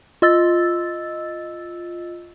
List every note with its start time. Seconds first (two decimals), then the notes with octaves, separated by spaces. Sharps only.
0.22 F4 D#5 E6 A6